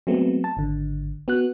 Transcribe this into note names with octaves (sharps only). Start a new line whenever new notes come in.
F#3 G#3 A3 B3 C4
A5
G#1 D3
B3 F#4 F#6